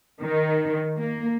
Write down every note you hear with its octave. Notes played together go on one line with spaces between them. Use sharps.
D#3
A#3